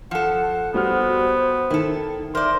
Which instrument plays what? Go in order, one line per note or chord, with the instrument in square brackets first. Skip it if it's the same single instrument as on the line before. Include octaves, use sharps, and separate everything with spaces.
[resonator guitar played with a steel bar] F3 A4 [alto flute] F#5
[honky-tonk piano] G3 F#4 F6 [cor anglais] B3 [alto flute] C5
[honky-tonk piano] D#3 [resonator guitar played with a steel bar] E4 A4
[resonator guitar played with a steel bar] A#4 D5 [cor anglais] C5 [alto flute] E5